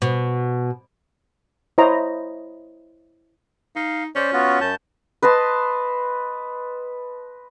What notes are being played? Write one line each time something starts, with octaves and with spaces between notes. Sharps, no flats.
B2
E4 C5 C#5 D#5 A#5
D#4 F5
C#4 C5 D5
B3 F4 F#4
F#2 A5 G6
B4 D#5 A5 C6